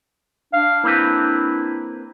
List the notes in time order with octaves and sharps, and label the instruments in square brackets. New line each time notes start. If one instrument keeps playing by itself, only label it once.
[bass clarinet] D4 [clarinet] F5
[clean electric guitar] A#3 C4 B4 [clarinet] E4